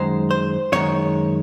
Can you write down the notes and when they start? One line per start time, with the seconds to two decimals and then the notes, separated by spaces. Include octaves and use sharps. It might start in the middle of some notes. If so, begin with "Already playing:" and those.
Already playing: F#2 D#3 G#3 C5
0.31 C5
0.72 F#2 D#3 G#3 C#5